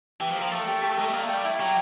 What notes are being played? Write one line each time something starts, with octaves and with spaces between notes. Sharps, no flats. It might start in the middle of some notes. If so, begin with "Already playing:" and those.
E3 G4
F3
A#4
F3
A3 D5
G4
G4
G#3 A#4
A3
A#3 D5
A3 G5
G3
E4
F#3 G4